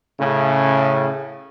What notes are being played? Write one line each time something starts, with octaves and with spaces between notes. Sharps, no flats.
A2 C#3